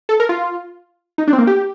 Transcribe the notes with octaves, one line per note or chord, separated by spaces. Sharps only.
A4
A#4
F4
D#4
D4
C4
A#3
G4